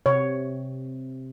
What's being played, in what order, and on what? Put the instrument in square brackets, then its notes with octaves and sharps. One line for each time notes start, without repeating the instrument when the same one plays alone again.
[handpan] C3 [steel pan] C#5